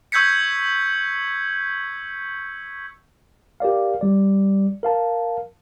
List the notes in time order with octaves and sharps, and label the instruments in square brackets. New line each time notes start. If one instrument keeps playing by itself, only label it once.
[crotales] C#6 E6 G6 G#6 B6 C#7
[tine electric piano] G4 A#4 D5 F5
G3 D5
A#4 F5 A5